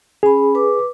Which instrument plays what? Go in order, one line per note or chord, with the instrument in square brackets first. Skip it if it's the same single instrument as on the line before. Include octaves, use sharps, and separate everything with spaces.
[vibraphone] C#4 B5 [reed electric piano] G#4
[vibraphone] B4 D6